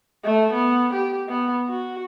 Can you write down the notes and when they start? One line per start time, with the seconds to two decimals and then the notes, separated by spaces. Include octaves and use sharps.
0.24 A3
0.53 B3
0.94 G4
1.29 B3
1.69 F#4